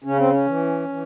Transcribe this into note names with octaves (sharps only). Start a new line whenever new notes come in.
C#3 C#4
C4
C#4
E3
E3